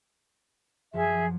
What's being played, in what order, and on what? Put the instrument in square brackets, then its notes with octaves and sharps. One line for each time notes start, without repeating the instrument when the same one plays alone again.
[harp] F#2 F3 [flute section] G#4 E5